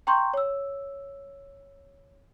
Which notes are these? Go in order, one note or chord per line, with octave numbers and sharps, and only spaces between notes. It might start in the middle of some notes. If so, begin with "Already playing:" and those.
G5 A#5 C6 C#6 G6
C#5 E6